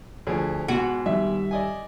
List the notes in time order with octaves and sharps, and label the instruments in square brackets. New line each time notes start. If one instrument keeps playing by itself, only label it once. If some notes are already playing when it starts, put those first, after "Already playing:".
[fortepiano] D2 F3 G#4
[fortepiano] G#2 B2 [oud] F#4
[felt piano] D#3 G3 E5
[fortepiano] D5 D#5 G#5